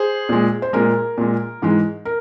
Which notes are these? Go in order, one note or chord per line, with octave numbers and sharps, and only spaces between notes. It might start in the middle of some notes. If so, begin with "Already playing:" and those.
Already playing: G#4 C5
A#2 G#3
C5
A#2 G#3 A#4
A#2 G#3
G#2 E3 G#3
A#4